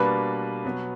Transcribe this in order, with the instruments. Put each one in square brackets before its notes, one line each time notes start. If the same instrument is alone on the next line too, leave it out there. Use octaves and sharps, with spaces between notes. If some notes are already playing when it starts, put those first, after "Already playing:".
Already playing: [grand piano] B2 G3 A#3 D4 [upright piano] B4
[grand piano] B2 F#3 B3